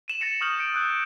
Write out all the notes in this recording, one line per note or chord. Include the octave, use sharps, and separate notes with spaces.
D#7 E7 F#7
A6 A#6 C#7 D#7
C#6 D#6 F6 G6 F#7
G6 C#7 D7
E6 F#6 G6